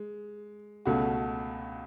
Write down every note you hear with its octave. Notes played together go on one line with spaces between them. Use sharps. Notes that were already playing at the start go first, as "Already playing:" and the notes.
Already playing: G#3
C#2 B2 A3 C#4 F#4